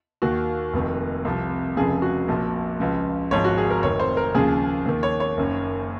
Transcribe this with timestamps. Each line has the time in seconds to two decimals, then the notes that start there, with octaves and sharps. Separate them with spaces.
0.22 D#2 D#3 F#4
0.74 F1 F2 D#3
1.25 C2 C3 F3
1.77 F1 F2 C#3 F3 G#4
2.02 F#4
2.28 A#1 A#2 F3
2.80 C#2 C#3 F3
3.31 G#1 G#2 F3 C#5
3.44 F#4
3.58 G#4
3.70 A#4
3.83 F1 F2 D#3 C#5
4.00 C5
4.17 A#4
4.35 D#2 C#3 F3 G#4
4.86 D#2 D#3
5.03 C#5
5.20 C#5
5.37 F#1 F#2 D#3